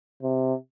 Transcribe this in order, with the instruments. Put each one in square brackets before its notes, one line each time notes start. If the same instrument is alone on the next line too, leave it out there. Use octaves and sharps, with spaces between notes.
[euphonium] C3